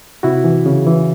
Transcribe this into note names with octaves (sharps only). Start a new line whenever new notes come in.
C3 E4 F#4
E3
C#3
E3